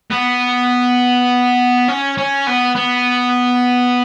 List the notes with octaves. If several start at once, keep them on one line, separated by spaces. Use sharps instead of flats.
B3
C#4
C#4
B3
B3